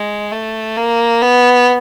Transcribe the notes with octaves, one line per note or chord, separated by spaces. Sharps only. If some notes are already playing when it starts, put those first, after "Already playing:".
Already playing: G#3
A3
A#3
B3